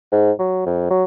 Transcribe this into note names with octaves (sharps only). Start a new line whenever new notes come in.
G#2
F#3
F2
F#3